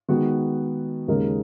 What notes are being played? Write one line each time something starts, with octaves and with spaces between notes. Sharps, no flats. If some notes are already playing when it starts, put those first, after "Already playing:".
D#3 G#3 B3 F#4
D#2 C#3 G#3 D#4 A#4